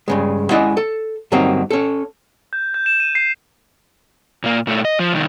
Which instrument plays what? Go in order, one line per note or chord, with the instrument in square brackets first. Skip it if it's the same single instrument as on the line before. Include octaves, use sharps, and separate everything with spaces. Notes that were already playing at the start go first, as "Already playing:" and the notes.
[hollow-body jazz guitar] G2 C#3 G#3
G#3 C#4 E4 D5 D#5 F#5
A4
G2 D3 F#3 A#3 C4 D#4
C#4 A4
[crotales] G6
G6
E7
D#7
C7
[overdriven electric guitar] A#2 A#3
A#2 A3
D#5
F3
C2 D#3